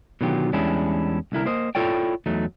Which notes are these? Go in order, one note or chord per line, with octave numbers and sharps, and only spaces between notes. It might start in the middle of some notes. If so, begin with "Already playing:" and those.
B2 D3 D#3 F#3 F4 G4
E2 G3 G#3 C#4 D4 E4
C2 D3 E4 A#4
A#3 C5 D#5
E4 F4 A4 C#5 D5 G5
E2 F#3 A3 D#4